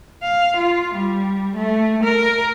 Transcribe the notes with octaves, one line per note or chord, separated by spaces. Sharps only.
F5
F4
G3
A3
A#4